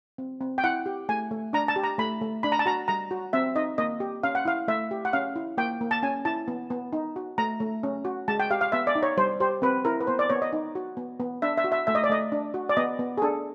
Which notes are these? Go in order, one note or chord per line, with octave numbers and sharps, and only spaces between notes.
C4
C4
G5
E4 F#5
G4
A3 G#5
A3
D4 A#5
A5
G4
A#5
A3 B5
A3
D4 B5
A#5
A5
F#4 A#5
G3 A#5
F#4
C4 E5
D#4 D#5
A#3 D#5
G4
C#4 F5
F#5
E4 F5
A3 E5
G4
F#5
C#4 F5
E4
A#3 G5
A#3
A5
C#4 G#5
E4 A5
B3
B3
D#4
F#4
A3 A#5
A3
C#4
F#4
G#3 A5
G5
G4 F5
F5
B3 E5
D5
D#4
C#5
G3 C5
G4 C5
C4 B4
E4 A#4
B4
B3 C5
D5
B3 C#5
D#5
D#4
F#4
B3
B3
D4 E5
E5
F#4
E5
A3 E5
D#5
D5
A3 D#5
D4
F#4
D5
B3 D#5
B3
G#4
D4 A4